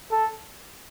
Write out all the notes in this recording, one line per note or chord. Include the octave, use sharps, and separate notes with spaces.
A4